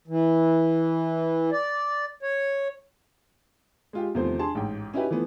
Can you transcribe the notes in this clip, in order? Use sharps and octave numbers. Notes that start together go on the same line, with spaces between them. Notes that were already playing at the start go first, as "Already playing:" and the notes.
E3
D5
C#5
G#3 F4 G4
E2 C3 D#3 F3 A3 C5
D4 G#4 A5 C6
A1 G#2 G5
C#4 D#4 E4 F#4 G4 B4
E3 F3 A3 B3